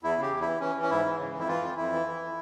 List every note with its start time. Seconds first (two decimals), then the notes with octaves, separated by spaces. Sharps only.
0.03 E2 E4
0.17 C#3
0.22 G4
0.32 E2
0.41 E4
0.47 E3
0.60 E3 C#4
0.75 E3
0.82 C#4
0.90 G#2 E4
1.05 E3
1.19 C#3
1.34 F2
1.39 E4
1.48 E3 F4
1.62 F2
1.77 F2 E4
1.92 E3
2.07 E3